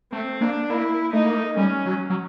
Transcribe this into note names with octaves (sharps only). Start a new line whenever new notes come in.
A3 C4
A#3 D4
A#3 E4
A3 D#4
A#3
A3
G3 C#4
F#3
F#3